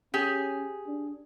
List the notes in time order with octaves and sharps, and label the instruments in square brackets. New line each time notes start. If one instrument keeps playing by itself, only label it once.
[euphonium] C#4 [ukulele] G4 [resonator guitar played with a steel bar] G#4
[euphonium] D4